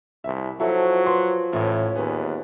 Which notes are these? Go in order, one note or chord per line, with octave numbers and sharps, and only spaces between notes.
C2 E5
F3 F#3 E4 F#4 A4 C5
B4 C6
A1 A2 C#5
D#2 G#3 B3